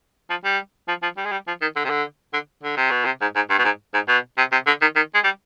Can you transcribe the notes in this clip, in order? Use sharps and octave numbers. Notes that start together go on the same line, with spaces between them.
F3
G3
F3
F3
G3
G#3
G3
F3
D#3
D3
C3
D3
D3
D3
C3
B2
C3
G#2
G#2
G2
B2
G#2
G#2
B2
C3
C3
D3
D#3
D#3
G#3
G3